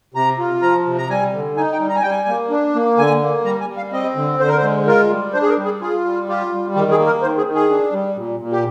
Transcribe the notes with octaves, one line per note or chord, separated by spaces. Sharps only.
C3 A#5
F4
F3 A#5
C3
A#5
G3 G#5
D3
D#4 G#5
G5
G3
A#5
G#5
G3 G5
G#5
A#3
D4
A#3
D3 G#5
A#3
G3 A#5
G#5
G3
F5
C4 D#5
D3
D3 C5
A#4
C5
G#3
F4 A#4
G3
D4 C5
G#4
A#4
G3
G#4
F4 G#4
G3
F4 G4
G3
D#3 G4
G#4
A#3
A#4
D#3 C5
G#4
D#3
G#4
D4
G3
A#2
A#2
G4